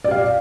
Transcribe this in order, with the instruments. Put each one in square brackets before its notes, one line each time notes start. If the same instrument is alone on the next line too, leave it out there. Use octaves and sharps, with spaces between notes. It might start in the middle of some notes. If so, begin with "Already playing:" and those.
[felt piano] D5
G4
F5